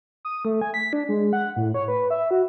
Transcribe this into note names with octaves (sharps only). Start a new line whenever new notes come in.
D#6
A3
G#5
B6
D4
G#3
F#5
A2
C#5
B4
E5
F#4